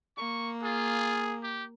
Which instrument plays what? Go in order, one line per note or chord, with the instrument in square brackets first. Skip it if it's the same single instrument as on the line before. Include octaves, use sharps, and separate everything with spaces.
[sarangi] A#3 [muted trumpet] C#6
[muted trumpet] F4 [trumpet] G#4
[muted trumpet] G4